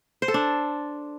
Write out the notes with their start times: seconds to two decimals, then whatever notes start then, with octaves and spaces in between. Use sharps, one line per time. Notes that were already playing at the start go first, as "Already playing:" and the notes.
0.22 C5
0.28 A4
0.34 D4